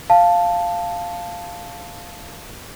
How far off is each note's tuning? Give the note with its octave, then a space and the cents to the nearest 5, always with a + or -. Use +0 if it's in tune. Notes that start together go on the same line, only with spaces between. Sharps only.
F5 +0 A5 +0